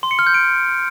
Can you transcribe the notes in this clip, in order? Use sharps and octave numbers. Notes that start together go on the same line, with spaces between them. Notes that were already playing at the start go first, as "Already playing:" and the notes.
C6
C#7
F6
G6
D7